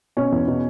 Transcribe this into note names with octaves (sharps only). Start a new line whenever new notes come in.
B2 C#4
E2
B2